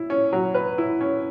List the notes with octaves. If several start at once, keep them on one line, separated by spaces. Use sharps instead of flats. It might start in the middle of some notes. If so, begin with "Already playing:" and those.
Already playing: E4
C#4
F#3
B4
E4
C#4